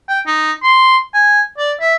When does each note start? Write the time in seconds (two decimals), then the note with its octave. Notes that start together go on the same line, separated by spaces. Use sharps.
0.09 G5
0.27 D#4
0.63 C6
1.14 G#5
1.58 D5
1.80 E5